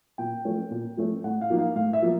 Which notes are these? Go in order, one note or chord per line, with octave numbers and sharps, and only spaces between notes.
A#2 G5
F3 A3 C#4
A#2
F3 A3 C#4
A2 F#5
F5
F3 A#3 D#4
F5
A2 F5
E5
F3 A#3